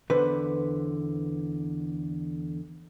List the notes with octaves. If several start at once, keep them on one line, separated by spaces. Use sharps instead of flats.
E2 D3 B4 C5